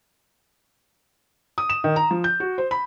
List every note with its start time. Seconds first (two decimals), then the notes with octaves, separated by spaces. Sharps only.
1.58 D#6
1.70 E7
1.84 D#3
1.96 A#5
2.11 F3
2.24 G6
2.40 F#4
2.58 C5
2.71 B5